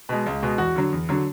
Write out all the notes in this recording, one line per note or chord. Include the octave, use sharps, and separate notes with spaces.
B2 G#3
C#2
B2 G#3
E2 F#4
D3 F#3
E2
D3 F#3